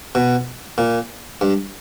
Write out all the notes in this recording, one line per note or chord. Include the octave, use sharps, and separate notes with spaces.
B2
A#2
G2